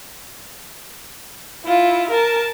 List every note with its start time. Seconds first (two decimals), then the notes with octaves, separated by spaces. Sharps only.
1.64 E4 F4
2.10 A#4 A5